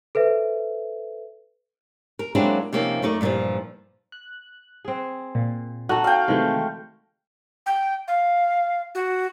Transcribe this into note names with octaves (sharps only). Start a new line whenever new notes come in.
A4 B4 C5 E5
A#4
F#3 G#3 A#3 C4 D4 E4
C3 F3 A#3 B3 C#4 D#4
F#2 A3 D#4 D5
G2 A#2 C#3 E3 F3
F#6
C4 G#4
A#2
D#4 F#4 A4 F#5 A5
F5 G5
C3 D#3 E3 G#3 A3
G5
F5
F#4